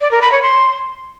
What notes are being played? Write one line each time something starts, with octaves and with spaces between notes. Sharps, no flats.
D5
A#4
B5
C#5
C6